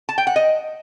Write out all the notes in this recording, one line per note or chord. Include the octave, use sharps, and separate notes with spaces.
A5
G5
F#5
D#5